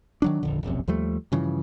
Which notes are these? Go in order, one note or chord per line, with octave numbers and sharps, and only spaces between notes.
D#3 F#3 D4
D#1 A#1 F2 D3
E1 A#1 F#2 C3
D#2 F3 G3 A3
G2 C#3 E3 F3